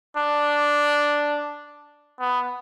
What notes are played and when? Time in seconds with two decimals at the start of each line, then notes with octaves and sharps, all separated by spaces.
0.17 D4
2.20 B3